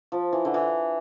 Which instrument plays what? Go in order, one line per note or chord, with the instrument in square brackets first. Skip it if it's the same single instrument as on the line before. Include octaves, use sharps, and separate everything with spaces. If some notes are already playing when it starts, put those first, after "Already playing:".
[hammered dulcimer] F3
E3
D3
E3